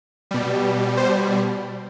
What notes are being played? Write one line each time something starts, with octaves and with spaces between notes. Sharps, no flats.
B2 G3
C5